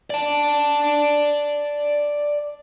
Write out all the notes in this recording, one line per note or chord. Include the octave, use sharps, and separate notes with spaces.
D5 A5